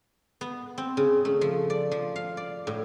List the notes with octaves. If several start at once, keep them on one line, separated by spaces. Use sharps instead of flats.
B3
C4
C#3
A3
F3
D5
F3
F5
D5
A2